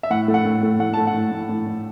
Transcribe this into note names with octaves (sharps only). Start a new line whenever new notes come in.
E5
A2 F#5
A3
F#5
A2
A3
A2 F#5
A3 A5
F#5
A2
A2
A2
A2